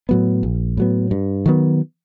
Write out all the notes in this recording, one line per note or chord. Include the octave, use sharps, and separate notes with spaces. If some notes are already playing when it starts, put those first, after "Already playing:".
A2 F#3 B3
A#1
A2 F#3 B3
G2
D#3 F#3 B3